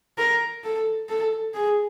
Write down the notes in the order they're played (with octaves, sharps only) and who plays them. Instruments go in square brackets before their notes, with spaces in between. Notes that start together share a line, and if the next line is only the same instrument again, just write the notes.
[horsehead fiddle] A#4
A4
A4
G#4